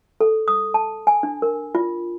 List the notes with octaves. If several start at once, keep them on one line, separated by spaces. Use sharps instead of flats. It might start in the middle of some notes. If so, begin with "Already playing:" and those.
A4
D#6
A5
G#5
D4
A#4
F4